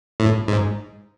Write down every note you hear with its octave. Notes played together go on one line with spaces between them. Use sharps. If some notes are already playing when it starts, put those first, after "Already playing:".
A2
G#2